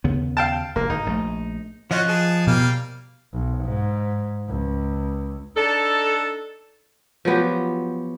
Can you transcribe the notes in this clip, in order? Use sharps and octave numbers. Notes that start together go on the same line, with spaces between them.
D#2 C#3 B3
F5 G5 A5
F1 D2 A#3
G#1 D#4
A#1 A3
F3 C#4 F4 F#4 D#5 F#6
G#4 A5
B2 G3 A#3 F5
B1
G#2
C#2
D4 D#4 A4
F3 F#3 B3 G4